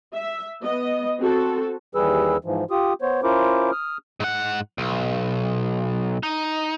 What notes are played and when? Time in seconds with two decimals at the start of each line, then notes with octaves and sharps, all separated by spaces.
0.14 E5
0.62 B3 D#5
1.19 C4 F#4 A4
1.95 D#2 E3 G3 G#4 B4 E6
2.45 G#2 E3 F3
2.71 F4 G4 D#6
3.02 B3 C5 C#5
3.23 C#4 E4 F4 A#4 C5 D6
3.72 D#6 F6
4.20 G#2 F#5
4.78 B1
6.23 D#4